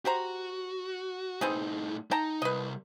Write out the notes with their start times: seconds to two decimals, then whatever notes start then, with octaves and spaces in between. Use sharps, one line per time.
0.05 F#4 G4 C5 A#5
1.41 A2 B3 C4 D#4 G#4
2.11 D#4 G5 A5 A#5
2.42 C2 B4 D#5